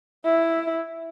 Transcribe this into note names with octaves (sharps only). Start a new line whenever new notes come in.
E4